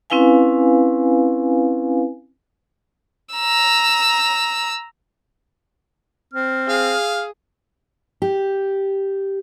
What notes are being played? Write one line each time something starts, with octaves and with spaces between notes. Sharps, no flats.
C4 C#4 E4 B4 F5 G#5
A#5 E6
C4 F6
G#4 F5
G4